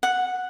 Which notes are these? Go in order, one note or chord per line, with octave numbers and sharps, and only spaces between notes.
F#5